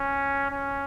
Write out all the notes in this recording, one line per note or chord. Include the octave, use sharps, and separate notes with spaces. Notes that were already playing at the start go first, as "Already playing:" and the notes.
Already playing: C#4
C#4